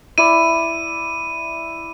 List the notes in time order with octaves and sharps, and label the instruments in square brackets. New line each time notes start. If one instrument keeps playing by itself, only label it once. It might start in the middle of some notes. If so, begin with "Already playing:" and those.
[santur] E4 D5 [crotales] D#7